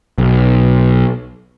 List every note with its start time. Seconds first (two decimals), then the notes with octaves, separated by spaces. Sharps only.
0.18 B1